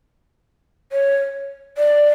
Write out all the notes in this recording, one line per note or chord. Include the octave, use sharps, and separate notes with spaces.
C#5
D5